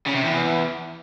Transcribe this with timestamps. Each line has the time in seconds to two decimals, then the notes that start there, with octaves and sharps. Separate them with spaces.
0.06 C#3
0.15 C3
0.24 E2